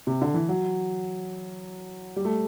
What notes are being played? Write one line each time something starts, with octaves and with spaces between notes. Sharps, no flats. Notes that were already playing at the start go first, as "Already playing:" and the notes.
C3
D3
E3
F#3
G3
A3